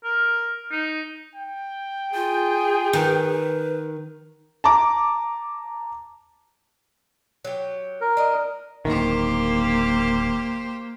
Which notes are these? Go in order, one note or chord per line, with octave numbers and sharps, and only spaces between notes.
A#4
D#4
G5
F4 G#4
D#3 B4
A5 A#5 D6
F#3 G4
A#4
D4 D#5
D1 G1 D#3 A#3 G4 C5